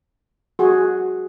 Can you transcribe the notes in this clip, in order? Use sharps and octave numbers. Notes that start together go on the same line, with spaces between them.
F#4 G#4